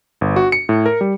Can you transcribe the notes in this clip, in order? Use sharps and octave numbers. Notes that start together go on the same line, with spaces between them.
G1
F#4
C#7
A2
A#4
G3